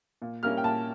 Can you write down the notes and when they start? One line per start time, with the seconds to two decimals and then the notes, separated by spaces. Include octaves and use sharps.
0.22 A#2
0.43 G3 A#3 C#4 E4 F6
0.57 G5
0.64 A#2 A5